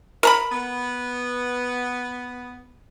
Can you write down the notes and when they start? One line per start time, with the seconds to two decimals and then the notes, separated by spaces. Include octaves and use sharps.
0.23 A#4 A#5 B5
0.51 B3